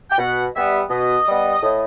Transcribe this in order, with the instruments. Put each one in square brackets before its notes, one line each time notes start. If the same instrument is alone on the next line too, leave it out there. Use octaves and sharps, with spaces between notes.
[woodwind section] G5
B2 F#5
G3 B3 E5
B2 D#5
G3 B3
A2